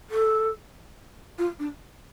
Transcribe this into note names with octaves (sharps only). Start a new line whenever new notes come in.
A4
F4
D4